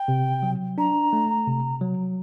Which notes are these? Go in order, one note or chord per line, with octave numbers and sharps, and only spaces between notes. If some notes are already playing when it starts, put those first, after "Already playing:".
Already playing: G5
C3
F#3
D4 A#5
A3
C3
F#3